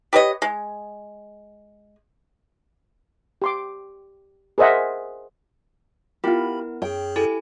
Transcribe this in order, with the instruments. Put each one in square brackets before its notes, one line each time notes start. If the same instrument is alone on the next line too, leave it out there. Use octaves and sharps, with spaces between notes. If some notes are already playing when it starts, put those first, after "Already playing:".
[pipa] G4 B4 C#5 D#5
G#3
[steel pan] G4 C6 D6
G#4 A#4 C5 D#5 E5 F#5
[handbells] B3 E4 A#4 [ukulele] F4 G4 [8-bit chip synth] B5
[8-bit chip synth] F#2 G#4 [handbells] C#5 [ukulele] G5
[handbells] E4 G4 G#5 [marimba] A4